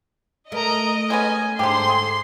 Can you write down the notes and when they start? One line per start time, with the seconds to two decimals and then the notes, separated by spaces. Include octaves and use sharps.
0.52 A3 A#4 D#5 A#5
1.10 G#3 B3 C#4 G#5
1.59 G#2 D3 A3 G4 C5 C6
1.90 G#4